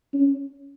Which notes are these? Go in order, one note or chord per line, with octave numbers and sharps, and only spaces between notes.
C#4